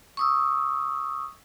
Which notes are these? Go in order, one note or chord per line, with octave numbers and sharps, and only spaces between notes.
C#6 D#6 E6